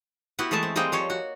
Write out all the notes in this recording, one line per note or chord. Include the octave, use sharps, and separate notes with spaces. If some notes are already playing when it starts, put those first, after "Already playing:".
B3 E4 F#4 G4
E3 G#3 A3 E5 A5
C4
G3 G#3 A#3 C4 D#5 G5
F3 G3 C#5
F#4